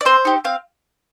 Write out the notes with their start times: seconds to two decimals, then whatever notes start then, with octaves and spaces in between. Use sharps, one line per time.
0.01 D5
0.05 C4 C5
0.25 D#4 G4
0.45 C4 F5